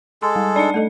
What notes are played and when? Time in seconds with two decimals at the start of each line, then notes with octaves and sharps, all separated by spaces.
0.22 G#3 A4 C6
0.36 G3
0.56 D4 D#4 D5 D#5 A5 C#7
0.74 A3 A4 D#5